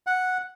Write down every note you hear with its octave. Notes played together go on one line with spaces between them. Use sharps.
F#5